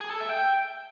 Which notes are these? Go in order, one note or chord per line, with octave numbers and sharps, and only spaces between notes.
G#4
A4
E5
G5